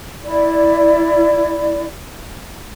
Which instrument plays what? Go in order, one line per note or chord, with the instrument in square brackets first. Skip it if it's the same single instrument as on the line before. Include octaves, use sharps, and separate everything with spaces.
[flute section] E4 D5